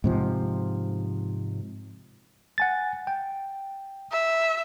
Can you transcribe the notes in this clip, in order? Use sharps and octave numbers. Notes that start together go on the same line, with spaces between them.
G#2 C3 F3
F#5 G#5 A6
G5
E5